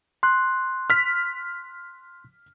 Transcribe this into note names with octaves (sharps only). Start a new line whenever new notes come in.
C6 F#6
F6 B6